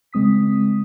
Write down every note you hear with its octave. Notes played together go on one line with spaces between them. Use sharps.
C#3 G#3 C4 D#6 B6